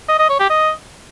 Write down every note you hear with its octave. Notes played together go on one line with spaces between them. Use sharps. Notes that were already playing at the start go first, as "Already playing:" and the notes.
D#5
D#5
C#5
G4
D#5